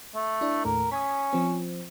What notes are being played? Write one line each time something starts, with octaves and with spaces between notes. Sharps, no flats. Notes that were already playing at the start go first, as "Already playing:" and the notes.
A3
D4 E4
D#2 A2 A4 A#4
C#4 D#6 G#6 B6
F3 C4